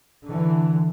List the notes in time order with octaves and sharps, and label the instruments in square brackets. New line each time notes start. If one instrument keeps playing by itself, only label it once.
[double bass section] D3 E3